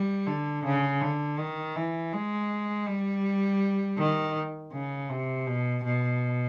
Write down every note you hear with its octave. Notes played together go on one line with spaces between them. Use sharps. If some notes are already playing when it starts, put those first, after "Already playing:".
Already playing: G3
D3
C#3
D3
D#3
E3
G#3
G3
D#3
C#3
C3
B2
B2